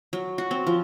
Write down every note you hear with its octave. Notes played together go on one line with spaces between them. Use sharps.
F#3
F#4
C4
F3